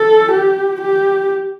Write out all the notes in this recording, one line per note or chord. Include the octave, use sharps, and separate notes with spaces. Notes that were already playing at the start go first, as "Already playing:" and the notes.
Already playing: A4
G4
G4